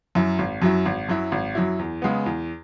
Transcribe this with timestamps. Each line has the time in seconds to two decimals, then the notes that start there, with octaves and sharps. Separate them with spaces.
0.15 F#2 F#3 E4
0.38 G#1
0.62 F#2 F#3 E4
0.85 G#1
1.09 F#2 F#3 E4
1.32 G#1
1.55 F#2 F#3 E4
1.79 E2
2.02 C#3 G#3 B3
2.26 E2